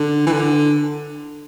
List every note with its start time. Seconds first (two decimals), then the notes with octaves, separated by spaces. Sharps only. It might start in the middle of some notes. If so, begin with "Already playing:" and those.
Already playing: D3
0.27 E3
0.33 D3